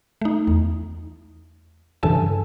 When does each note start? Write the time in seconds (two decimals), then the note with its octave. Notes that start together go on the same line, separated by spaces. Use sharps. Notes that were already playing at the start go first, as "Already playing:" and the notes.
0.21 A3 D#4
0.47 E2
2.03 G2 C#3 E3 A4 G#5 A5